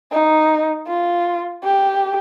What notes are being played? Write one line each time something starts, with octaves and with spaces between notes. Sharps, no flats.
D#4
F4
G4